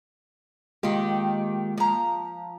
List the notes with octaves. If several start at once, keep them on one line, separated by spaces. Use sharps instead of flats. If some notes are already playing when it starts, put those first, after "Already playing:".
D#3 G#3 A#3 F4 G4
F3 A#5